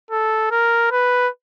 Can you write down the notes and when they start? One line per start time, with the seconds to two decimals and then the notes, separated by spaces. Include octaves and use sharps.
0.11 A4
0.51 A#4
0.92 B4